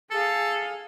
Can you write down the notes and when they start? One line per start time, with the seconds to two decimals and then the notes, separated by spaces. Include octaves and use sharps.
0.11 G#4 A4 F5